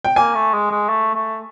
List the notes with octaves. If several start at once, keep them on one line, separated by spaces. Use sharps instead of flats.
G5
A#3 G#5
A3
G#3
G#3
A3
A3